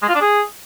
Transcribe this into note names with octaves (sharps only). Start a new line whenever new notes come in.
G#3
F4
D4
G#4